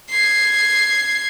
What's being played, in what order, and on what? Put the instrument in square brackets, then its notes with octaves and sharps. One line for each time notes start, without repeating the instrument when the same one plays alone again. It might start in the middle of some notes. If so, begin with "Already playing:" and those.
[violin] G#6 C7